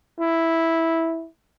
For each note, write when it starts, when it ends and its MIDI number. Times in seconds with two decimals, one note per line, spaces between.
0.19 1.26 64